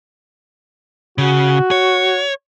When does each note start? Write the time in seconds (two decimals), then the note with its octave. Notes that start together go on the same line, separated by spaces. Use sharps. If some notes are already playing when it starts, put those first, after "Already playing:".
1.18 C#3 F#4
1.71 C#5